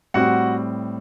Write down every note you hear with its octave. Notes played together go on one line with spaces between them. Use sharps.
A2 G3 C4 F#4 F#5